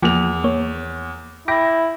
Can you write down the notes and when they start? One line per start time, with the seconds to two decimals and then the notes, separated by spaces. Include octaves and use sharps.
0.02 E2 F3 A#3 F7
0.44 A#3 C#5
1.48 E4 G5 B5 D6 A#6